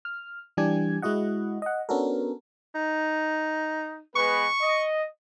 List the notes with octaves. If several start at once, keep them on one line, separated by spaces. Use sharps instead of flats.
F6
E3 G3 D4 G4 G#5 G#6
G#3 E4 F#4 D#5 F#5
D#5 F#5
B3 C#4 D4 F#4 A4 A#4
D#4
G#3 B3 B4 C#6
D#5